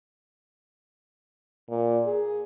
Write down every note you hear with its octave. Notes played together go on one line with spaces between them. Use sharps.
A#2
G#4